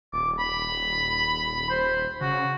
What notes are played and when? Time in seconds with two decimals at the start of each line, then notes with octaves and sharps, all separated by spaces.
0.13 D#1 D6
0.39 B5
1.70 C5
2.21 C#3 F#4